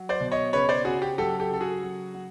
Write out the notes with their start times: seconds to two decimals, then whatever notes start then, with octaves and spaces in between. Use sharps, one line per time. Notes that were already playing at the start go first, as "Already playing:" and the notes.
Already playing: F#3
0.09 C5 D5
0.20 B2
0.32 C#5 D#5
0.53 C#3 B4 C#5
0.69 C5 D5
0.85 C#3 F#4 G#4
1.02 G4
1.18 F#3 G4 A4
1.39 G4 A4
1.50 C#3 A4
1.60 F#4 G#4
1.83 F#3
2.14 F#3